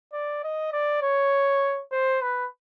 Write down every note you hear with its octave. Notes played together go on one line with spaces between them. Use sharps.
D5
D#5
D5
C#5
C5
B4